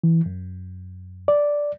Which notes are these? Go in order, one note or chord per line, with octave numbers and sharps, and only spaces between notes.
E3
F#2
D5